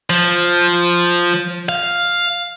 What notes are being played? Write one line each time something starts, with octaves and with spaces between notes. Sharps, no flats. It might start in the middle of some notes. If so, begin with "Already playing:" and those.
F3
F5